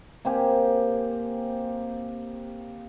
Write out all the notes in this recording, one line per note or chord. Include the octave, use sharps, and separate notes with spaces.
A#3 C4 G4 G#5